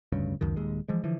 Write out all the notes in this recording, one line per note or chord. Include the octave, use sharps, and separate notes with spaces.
F1 D2 G2 C#3
C#2 F#2 D#3
D#1 D#2 G#3
E3 F3 G#3
D3 E3 F3